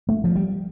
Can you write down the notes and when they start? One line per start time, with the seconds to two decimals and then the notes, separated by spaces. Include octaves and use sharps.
0.09 A3
0.24 F3
0.36 G3